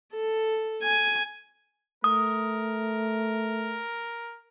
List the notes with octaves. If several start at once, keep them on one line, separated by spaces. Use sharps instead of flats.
A4
G#5
A3 A#4 D#6